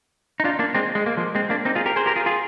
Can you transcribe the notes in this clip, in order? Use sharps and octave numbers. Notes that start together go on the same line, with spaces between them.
D#4
D4 F4
A#3 D4
G#3 C4
G#3
A#3
F3 G#3
G#3 C4
A#3 D4
C4 D#4
F4 G#4
G4 A#4
G#4 C5
G4 A#4
F4 G#4
F4 G#4